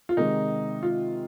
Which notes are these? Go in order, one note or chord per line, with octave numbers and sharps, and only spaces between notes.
F4
C3 D#3 G#3 D#4
F4